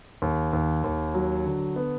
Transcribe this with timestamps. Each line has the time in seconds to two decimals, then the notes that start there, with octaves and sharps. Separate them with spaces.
0.22 D#2
0.53 D#2
0.84 D#2
1.14 F#3
1.46 D3
1.76 B3